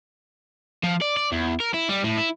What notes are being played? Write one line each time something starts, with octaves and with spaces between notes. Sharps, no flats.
F3
D5
D5
E2
A#4
E4
G3
A2
E4